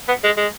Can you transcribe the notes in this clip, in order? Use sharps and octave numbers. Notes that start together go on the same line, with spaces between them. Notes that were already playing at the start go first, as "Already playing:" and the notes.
B3
G#3
G#3